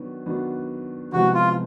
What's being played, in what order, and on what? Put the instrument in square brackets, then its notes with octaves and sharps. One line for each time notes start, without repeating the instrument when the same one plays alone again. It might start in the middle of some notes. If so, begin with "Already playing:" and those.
Already playing: [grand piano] D#3 F#3 B3 D4 F#4
D#3 F#3 B3 D4 F#4
[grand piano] C3 F3 G#3 B3 E4 [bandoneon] F#4
[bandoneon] F4